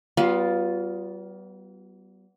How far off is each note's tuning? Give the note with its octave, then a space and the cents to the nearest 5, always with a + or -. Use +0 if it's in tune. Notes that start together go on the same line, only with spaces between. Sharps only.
G3 -40 B3 +0 F4 +5